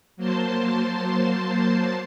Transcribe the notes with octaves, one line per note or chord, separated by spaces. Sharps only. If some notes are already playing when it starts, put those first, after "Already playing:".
F#3 A#3 C5 A5 C6